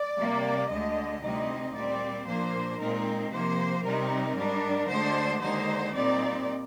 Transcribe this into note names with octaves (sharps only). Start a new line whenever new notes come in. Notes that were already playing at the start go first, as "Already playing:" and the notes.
Already playing: D5
C3 G3 A#3
D2 D3 G#3 D#5
D2 C3 G3 C4 D#4 D#5
A#2 G3 C4 D5
A#2 F3 A#3 D4 C5
A#2 G#3 C4 D#4 A#4
C3 F3 A#3 C5
C3 G3 C4 D#4 A#4
G#2 G3 D4
D2 D3 G#3 D4 C5
D#2 D3 G#3 D#4 C5
A#2 G3 C4 D#4 D5